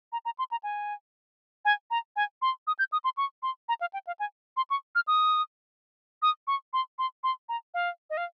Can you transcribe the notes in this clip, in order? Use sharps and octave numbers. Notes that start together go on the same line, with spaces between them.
A#5
A#5
C6
A#5
G#5
G#5
A#5
G#5
C6
D#6
G6
D#6
C6
C#6
C6
A#5
F5
G5
F5
G#5
C6
C#6
F6
D#6
D#6
C#6
C6
C6
C6
A#5
F5
D#5
F5